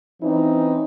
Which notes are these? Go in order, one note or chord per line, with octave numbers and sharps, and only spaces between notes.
E3 C4 C#4 D#4